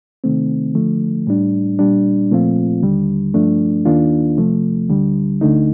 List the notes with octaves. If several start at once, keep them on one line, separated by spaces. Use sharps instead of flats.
C3 D#3 A3 C4
D3 F3 A3
A2 G3 D4
A#2 G3 D4
A#2 F3 A3 C4 F4
D#2 D3 G3
G2 F3 A3 D4
D#2 D#3 A#3 D4 F4
C3 F3 A3
D2 D3 G3
D2 D3 A3 D#4